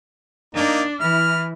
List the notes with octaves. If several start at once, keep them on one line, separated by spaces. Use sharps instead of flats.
A#3 D4 D#4
E3 E4 F6